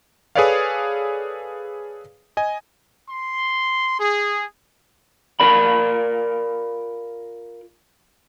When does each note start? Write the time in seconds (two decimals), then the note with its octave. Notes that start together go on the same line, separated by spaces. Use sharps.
0.36 G#4 A4 B4 C#5 D5 F5
2.37 D#5 G#5
3.10 C6
4.00 G#4
5.40 F4 A#4 D5 B5